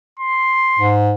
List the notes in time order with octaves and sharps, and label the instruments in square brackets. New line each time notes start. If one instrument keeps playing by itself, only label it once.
[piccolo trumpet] C6
[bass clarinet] G#2